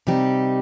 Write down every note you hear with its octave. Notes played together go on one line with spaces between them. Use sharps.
C3 G3 D#4 G4